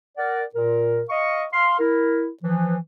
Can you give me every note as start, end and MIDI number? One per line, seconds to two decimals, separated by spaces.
0.18 0.43 70
0.18 0.43 74
0.18 0.43 78
0.55 1.02 46
0.55 1.02 70
1.10 1.44 75
1.10 1.44 77
1.10 1.44 85
1.53 1.78 77
1.53 1.78 84
1.79 2.28 64
1.79 2.28 70
2.43 2.77 52
2.43 2.77 53